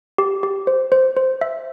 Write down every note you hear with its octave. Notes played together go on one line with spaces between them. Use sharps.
G4
G4
C5
C5
C5
E5